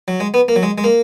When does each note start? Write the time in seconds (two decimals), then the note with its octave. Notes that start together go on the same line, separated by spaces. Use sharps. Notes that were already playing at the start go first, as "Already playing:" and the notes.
0.08 F#3
0.20 G#3
0.34 B3
0.48 A#3
0.56 F#3
0.63 G#3
0.78 G#3
0.84 A#3